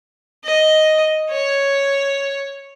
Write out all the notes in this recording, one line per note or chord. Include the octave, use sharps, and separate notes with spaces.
D#5
C#5